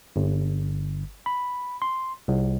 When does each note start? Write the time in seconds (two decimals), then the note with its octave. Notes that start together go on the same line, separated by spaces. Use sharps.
0.16 G1
1.26 B5
1.82 C6
2.28 C2